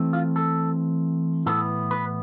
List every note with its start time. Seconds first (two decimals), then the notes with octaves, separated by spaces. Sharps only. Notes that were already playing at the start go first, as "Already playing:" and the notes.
Already playing: E3 A3 C4
0.13 F4
0.36 A4
1.46 A2 E3 B3 A4
1.91 B4